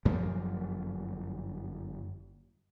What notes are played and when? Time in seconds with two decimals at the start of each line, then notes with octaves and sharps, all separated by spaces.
0.05 G1 F#2 F3 A#3